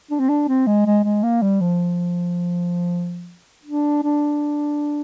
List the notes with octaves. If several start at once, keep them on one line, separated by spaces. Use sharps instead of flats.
D4
C4
D4
C4
G#3
G#3
G#3
A#3
G3
F3
D4
D4